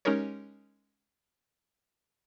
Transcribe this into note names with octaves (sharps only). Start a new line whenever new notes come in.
G#3 C#4 D#4 G4 A#4 C#5